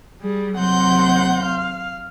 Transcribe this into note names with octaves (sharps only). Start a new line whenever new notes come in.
G3 G#4
D#2 C3 F#3 F#5 C6 G6
F5